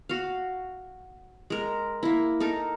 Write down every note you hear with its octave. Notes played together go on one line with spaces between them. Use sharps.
F#4 F5
G#3 A#4
A#3 E4
D#4 A4 A#4